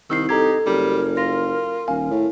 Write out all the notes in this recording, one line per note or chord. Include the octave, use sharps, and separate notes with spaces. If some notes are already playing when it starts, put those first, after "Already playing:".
C2 D#3 E6 C7
D#4 G4 A4 A#5 G#6
F#1 G3 A#4
F4 A#6
D#1 F5 G#5
A2